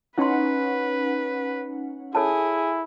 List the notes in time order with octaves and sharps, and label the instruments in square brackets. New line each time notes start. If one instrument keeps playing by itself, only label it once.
[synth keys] C#4 D#4 F#5 [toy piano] E4 C6 [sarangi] B4
[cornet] E4 [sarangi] G#4 [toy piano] A4 C#5 A5